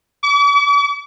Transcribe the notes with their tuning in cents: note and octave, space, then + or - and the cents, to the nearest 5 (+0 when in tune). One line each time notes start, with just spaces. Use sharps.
D6 -45